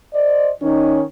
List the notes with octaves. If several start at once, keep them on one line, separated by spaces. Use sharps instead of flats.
C5 D5 D#5
D#3 C#4 D#4